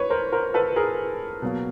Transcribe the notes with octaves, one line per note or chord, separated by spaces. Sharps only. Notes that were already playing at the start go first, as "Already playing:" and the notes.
Already playing: B4 C#5
A#4 C5
A#4 C5
A4 B4
G#4 A#4
B2 F#3 A#3